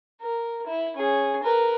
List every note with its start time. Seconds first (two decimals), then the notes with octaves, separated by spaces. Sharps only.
0.22 A#4
0.67 E4
0.97 C#4 G#4
1.43 A#4 B4